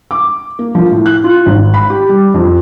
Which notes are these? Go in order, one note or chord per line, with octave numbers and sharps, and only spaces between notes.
D6
A#3
F3
A2
F#6
F4
G#1
B5
G4
G3
F2